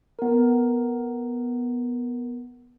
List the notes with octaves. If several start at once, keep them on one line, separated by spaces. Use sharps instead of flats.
B3 A#4